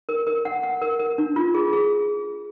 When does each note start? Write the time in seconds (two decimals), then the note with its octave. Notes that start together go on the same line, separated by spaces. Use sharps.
0.09 A#4
0.27 A#4
0.45 F#5
0.63 F#5
0.82 A#4
0.99 A#4
1.18 D4
1.36 F4
1.54 G#4
1.73 G#4